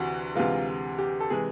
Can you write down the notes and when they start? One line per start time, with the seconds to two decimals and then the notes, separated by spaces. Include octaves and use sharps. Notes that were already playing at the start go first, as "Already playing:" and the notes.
Already playing: D2 C3 E3 F#4
0.35 D2 C3 E3 G#3 F4
0.98 G4
1.20 A4
1.30 C3 E3 G#3 G#4